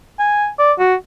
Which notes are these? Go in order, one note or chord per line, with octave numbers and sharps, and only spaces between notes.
G#5
D5
F#4